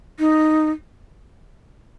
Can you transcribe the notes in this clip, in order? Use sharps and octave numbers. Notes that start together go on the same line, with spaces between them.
D#4